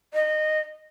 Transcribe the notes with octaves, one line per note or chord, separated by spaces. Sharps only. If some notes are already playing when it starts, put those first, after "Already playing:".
D#5